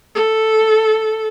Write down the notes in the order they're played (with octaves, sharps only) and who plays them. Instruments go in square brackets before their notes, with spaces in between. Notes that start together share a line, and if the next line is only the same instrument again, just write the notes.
[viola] A4